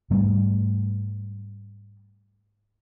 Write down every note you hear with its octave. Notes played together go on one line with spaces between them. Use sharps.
G#2 G3 A3